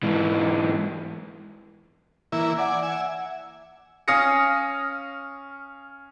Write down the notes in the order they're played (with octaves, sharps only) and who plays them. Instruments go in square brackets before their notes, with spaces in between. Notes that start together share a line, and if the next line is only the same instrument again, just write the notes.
[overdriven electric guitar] G#2 E3
[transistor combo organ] E3 A#3 E4
[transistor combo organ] D5 G#5 [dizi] F#5
[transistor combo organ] E5 G#5
[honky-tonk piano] C#4 F5 D#6 A#6 C#7